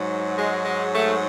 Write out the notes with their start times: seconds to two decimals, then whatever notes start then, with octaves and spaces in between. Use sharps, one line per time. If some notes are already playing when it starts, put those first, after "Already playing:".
Already playing: G#2 F#3
0.37 G#3
0.65 G#3
0.93 A3